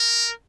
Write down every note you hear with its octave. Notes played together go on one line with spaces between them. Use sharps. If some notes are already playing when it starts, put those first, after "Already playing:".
Already playing: A#4